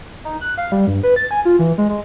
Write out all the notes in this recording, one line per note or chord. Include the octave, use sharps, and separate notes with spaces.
D#4
F#6
F5
G3
G2
B4
A6
G#5
F4
E3
G#3
G#3